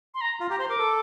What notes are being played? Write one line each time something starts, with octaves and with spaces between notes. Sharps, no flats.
C6
A#5
F4
G4 A#5
C5 C6
A#4 D6
A4